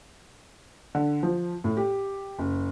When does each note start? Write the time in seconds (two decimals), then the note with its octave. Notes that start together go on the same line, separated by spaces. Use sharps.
0.95 D3
1.23 F3
1.64 A2
1.77 G4
2.39 F#1